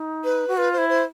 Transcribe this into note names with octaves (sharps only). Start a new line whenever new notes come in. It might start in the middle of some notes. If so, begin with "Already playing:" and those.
Already playing: D#4
B4
F#4
F4 B4
C5
E4
C5